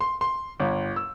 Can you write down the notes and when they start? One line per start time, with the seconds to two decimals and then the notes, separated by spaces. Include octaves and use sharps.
0.01 C6
0.21 C6
0.60 G1
0.96 E6